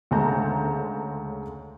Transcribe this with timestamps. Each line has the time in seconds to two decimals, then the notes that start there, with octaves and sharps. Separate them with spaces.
0.11 D2 C#3 G#3 A5 A#5 G6